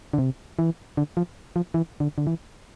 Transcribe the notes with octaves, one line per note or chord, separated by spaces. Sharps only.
D3
C3
E3
D3
F3
F3
E3
D3
D3
E3